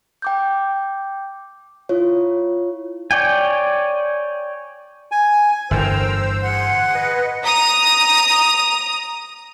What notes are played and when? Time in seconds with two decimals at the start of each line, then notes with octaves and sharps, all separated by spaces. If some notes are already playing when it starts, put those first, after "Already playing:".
0.22 G5 D6 G6
1.89 E4 F4 C#5
3.11 C#5 D5 G5 G#5
5.12 G#5
5.71 G1 A2 E3 A#4 C5 G5 E6
6.42 G#4 F#5 C6 F#6
6.94 B4 D#5
7.44 A#5 D#6